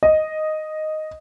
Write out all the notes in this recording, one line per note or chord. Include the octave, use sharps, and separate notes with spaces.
D#5